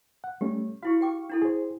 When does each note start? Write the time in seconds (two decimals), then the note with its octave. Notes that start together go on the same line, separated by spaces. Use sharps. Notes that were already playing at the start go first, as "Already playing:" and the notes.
0.24 F#5
0.41 G3 A3 C#4 G4
0.83 E4 F#4 F5 C#6
1.01 G4 G5 D6
1.30 D4 E4 A4
1.42 G#4 C5